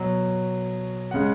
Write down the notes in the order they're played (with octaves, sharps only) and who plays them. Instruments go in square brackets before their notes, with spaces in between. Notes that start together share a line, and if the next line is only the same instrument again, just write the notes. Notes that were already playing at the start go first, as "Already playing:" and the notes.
Already playing: [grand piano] B2 F#3
C#3 G#3 F#5